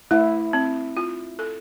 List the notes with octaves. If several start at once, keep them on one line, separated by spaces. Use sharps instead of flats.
A3 E4
C4
F4
A4